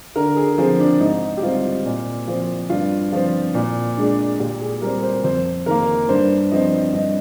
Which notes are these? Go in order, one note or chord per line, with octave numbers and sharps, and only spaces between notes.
D3 A#4
G#4
F3 C4 G#4
D4
G#2 D#4
G4
G3 C4 F4
A#2
F3 C4
G2 F4
F3 C4 F4
A#2
G#3 D4
A#2 G4
G#4
G3 C4 A#4
C5
F2 C5
D#3 A#3 A#4
G2 C5
F3 C4 D#5
G2 D#5